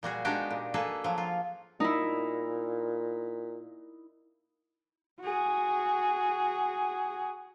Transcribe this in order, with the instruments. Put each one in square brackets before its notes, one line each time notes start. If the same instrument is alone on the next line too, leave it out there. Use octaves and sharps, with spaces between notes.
[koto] A#2 G3 F#4 G#4
G#3 B3 D4 D#4 F#4 G4
A#2
A#3 G#4 A4 B4
F3 F#3
F4
[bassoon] A#2 [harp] D#4 E4
[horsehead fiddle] F#4 G#4